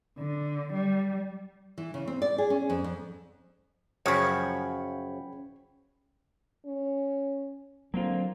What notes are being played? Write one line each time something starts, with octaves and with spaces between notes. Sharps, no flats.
D3
G3
E3
C#3
C4
D5
G#4
C#4
F2
F2
F#2 C#3 F3 C#4 C#5 G5 B5 C#6
C#4
D3 F#3 A#3 C4 F4